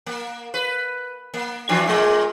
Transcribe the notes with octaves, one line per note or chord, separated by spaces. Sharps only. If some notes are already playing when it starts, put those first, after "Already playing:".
A#3
B4
A#3
E3 F3 D4
A#2 G#3 A3